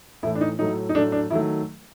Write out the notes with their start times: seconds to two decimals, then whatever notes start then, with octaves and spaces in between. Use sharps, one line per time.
0.23 A2 E3 A3 E4
0.36 D4
0.41 D#4
0.59 A2 F#3 A3 D#4
0.89 D#4
0.95 A2 F#3 A3 D4
1.12 D4
1.30 D#3 F#3 A3 E4